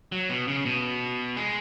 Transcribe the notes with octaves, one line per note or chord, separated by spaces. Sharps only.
F#3
B2
C#3
B2
G#3